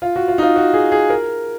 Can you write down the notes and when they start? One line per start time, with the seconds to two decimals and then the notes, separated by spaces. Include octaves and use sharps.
0.02 F4
0.16 F#4
0.28 F4
0.38 D#4
0.42 F4
0.56 F#4
0.74 G#4
0.92 G#4
1.10 A#4